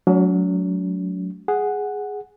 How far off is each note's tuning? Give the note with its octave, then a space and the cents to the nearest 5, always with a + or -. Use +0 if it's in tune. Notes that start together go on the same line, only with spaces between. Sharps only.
F#3 -10 A3 -40 C#4 +45
G#4 +0 F#5 +0